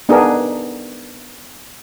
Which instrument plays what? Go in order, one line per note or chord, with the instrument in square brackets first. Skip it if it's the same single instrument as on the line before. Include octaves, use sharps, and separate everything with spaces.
[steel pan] B3 D4 D#4 G#4 A#4